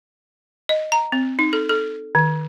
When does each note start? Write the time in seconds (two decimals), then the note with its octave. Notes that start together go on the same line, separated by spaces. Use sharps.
0.69 D#5
0.92 A#5
1.12 C4
1.39 D#4
1.53 A4
1.69 A4
2.15 D#3